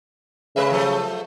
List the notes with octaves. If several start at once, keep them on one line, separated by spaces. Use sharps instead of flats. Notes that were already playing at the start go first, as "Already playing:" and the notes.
C#3 G#3 B4 E5
F3 F#3 A3